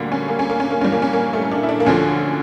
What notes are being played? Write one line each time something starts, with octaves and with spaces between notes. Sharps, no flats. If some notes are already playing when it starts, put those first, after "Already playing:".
Already playing: D2 D3 G3 A#3
C#4
A#3
C#4
A#3
C#4
A#3
G2 E3 G3 C#4
A#3
C#4
A#3
A3
D4
E4
D4
A#3
D2 D3 F3 C#4